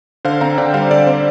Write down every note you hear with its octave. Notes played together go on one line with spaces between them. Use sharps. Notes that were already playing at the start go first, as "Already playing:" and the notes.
D3 C5 F5
C4 F5 A#5
D3 D5 G5
G3 C5 F5
D3 D5
C4 C5